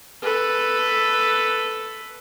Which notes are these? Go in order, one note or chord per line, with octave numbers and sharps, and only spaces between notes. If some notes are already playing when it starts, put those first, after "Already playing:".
A4 B4